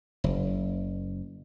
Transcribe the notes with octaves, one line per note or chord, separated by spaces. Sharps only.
F#1